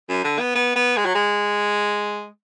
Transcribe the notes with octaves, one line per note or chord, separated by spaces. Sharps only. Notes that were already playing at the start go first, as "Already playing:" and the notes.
F#2
D3
B3
B3
B3
G#3
F#3
G#3